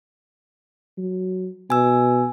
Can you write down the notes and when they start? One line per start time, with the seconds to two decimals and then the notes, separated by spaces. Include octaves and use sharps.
0.98 F#3
1.70 B2 G#5 E6